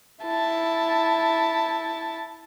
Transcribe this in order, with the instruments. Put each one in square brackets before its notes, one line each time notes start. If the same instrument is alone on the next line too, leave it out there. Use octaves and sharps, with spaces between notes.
[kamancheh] E4 A5